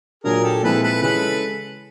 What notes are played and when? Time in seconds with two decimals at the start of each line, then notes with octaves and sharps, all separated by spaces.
0.24 A#2 F#3 A#3 D4 G#4 A#4
0.44 G4 A4
0.63 A#2 F3 G#3 C4 E4 A4 B4
0.83 A4 B4
1.02 C#3 E3 G#3 A4 B4